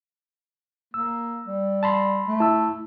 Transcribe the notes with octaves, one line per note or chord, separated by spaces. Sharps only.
A#3 E6
G3
A5 B5 C6
A3
E4 A5 E6